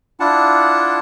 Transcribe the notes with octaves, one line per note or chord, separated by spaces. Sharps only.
D4 E4 F4 F#5 A5